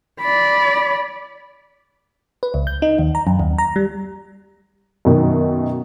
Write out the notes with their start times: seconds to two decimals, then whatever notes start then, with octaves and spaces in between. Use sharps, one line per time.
0.21 D5 B5
2.43 B4
2.54 C#2
2.67 G6
2.82 D#4
2.99 D#2
3.15 A#5
3.27 F#2
3.39 D#2
3.58 A#5
3.76 G3
5.05 F#2 B2 D#3